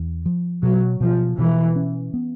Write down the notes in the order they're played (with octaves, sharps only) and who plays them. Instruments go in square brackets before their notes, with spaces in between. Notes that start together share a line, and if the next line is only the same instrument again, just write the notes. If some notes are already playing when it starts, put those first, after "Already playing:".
Already playing: [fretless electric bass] E2
F3
[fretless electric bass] B2 [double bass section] F#3
[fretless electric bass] B2 [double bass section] F3
[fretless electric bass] B2 [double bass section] E3
[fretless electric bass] C#4
B3